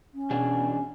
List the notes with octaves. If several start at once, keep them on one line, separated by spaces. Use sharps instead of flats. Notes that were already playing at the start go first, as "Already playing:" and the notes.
C#4
E2 B2 D4 G#4